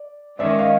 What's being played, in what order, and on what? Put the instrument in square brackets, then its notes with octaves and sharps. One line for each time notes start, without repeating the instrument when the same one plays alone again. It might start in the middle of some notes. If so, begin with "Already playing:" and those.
Already playing: [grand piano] D5
[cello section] D#3 G#3 C#4 [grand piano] D5 E5
[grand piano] D#5 F5